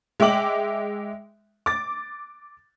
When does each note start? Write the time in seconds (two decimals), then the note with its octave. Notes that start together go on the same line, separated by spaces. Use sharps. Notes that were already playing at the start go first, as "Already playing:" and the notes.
0.20 G#3 E5 G5 D6 F#7
1.66 D6 A6